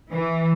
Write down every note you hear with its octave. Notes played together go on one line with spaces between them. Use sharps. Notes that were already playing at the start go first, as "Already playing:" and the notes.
E3